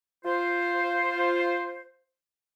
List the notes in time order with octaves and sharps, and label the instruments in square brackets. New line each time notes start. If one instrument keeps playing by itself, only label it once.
[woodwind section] F4 C5